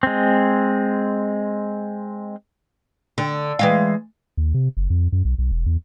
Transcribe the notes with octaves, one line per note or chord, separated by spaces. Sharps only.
G#3 C4
D3
E3 G#3 F5
D#2
C3
F#1
F2
F#2
B1
B1
E1
E2